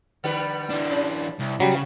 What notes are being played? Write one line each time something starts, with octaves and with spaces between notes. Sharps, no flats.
D3 G3 B4
E3 D4
C#4
C2
C#3 F#3 G3